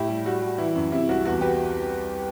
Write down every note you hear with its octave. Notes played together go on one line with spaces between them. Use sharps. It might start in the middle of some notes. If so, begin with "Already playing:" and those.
Already playing: A2 E4 G4
G3
G3 F#4
G3
E3 E4
F#2
C3 E4
C2 F#4
E2 F#4
G4 B4